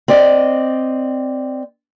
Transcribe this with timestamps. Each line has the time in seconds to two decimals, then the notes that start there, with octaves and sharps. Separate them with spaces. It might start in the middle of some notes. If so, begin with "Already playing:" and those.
0.08 C4 D5 D#5